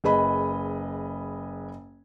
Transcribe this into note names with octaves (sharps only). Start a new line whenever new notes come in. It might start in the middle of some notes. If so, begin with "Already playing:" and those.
F#1 G#4 B4 D#5 B5